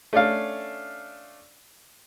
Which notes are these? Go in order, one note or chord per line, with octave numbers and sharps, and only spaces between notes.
A3 C#4 D4 D5 F5